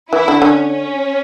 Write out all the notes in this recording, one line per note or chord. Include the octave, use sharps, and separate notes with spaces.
E3 E4
D3
D3 C#4
C#4